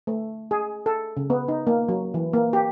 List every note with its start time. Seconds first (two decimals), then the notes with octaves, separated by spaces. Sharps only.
0.07 A3
0.51 G#4
0.86 A4
1.17 C#3
1.30 B3
1.48 D#4
1.67 A#3
1.89 F#3
2.14 E3
2.33 A#3
2.53 G4